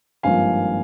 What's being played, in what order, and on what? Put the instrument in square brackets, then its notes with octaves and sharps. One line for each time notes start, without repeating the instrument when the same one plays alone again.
[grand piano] G#1 G2 F3 A#3 F4 F5 G#5